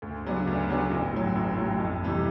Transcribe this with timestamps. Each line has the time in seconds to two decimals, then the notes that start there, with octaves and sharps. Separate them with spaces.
0.02 D2
0.24 C#3 F#3 B3 D4
0.47 D2
0.69 C#3 F#3 B3 D4
0.91 A1
1.13 A2 F#3
1.35 A1
1.57 A2 F#3
1.80 F2
2.02 C3 E3 G3